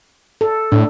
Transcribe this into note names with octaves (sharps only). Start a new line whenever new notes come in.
A4
A2 D4